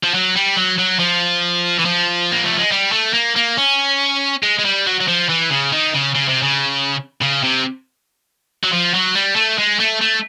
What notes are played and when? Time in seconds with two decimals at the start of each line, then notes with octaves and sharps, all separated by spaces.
0.03 F3
0.14 F#3
0.36 G3
0.57 F#3
0.79 F#3
0.99 F3
1.79 E3
1.85 F3
2.32 A#3
2.45 A3
2.59 G#3
2.72 G3
2.92 A3
3.14 A#3
3.36 A#3
3.57 C#4
4.43 G#3
4.59 G#3
4.65 G3
4.87 F#3
5.01 F#3
5.08 F3
5.29 E3
5.51 C#3
5.72 D#3
5.94 C#3
6.15 C#3
6.28 C3
6.43 C#3
7.22 C#3
7.44 C3
8.64 F#3
8.72 F3
8.94 F#3
9.15 G3
9.36 A3
9.58 G#3
9.80 A3
10.02 A3